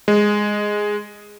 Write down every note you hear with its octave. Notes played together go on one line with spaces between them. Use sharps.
G#3